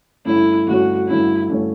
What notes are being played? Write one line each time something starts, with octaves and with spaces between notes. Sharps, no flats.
G2 D3 A3 C#4 E4
G2 D3 A3 C#4 F#4
G2 D3 A3 C#4 E4
G2 D3 A3 C#4